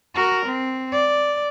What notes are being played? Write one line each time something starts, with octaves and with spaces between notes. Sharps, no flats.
F#4 A#4
C4
D5